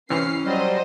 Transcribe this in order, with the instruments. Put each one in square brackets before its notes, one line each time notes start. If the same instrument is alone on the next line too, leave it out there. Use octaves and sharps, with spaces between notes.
[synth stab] G#2 C3 E3 [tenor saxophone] C#4 [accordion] F6 [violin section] C7
[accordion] F#3 G3 [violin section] C5 D#5